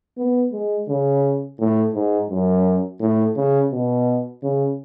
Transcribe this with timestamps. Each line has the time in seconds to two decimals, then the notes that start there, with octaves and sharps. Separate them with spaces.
0.18 B3
0.53 G#3
0.88 C#3
1.60 A2
1.95 G#2
2.30 F#2
3.01 A2
3.36 C#3
3.72 B2
4.43 C#3